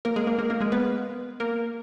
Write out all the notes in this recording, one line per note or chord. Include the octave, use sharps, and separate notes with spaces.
A#3 A#4
G#3 G#4
A#3 A#4
A#3 A#4
A#3 A#4
G#3 G#4
B3 B4
A#3 A#4